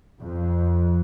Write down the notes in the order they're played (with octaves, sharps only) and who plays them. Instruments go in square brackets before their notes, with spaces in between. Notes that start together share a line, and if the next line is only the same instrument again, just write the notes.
[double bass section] F2